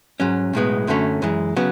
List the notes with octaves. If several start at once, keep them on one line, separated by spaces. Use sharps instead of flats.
G#2 F#3 C#4
B1 A2 G#3 B3
F#2 D3 F#3 A3 C#4
F#2 E3 G#3
C#3 F#3 B3